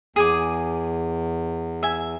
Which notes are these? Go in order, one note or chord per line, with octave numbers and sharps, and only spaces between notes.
E2 G#4 G#5 D6
E5 G#5